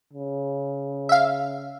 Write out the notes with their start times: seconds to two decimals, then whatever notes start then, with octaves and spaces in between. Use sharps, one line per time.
0.13 C#3
1.09 E5 F5